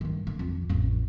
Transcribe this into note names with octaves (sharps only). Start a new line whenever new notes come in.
G2 D#3
D3
F2
A1 F2